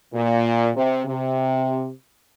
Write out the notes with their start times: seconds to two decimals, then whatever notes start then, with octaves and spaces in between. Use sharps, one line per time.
0.14 A#2
0.76 C3
1.07 C3